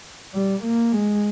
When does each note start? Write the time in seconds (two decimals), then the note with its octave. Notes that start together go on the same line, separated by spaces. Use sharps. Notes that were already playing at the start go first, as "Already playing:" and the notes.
0.35 G3
0.63 A#3
0.92 G#3